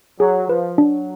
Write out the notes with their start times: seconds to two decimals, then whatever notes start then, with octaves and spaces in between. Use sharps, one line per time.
0.19 F#3 G#4
0.48 F3 B4
0.78 F#3 D4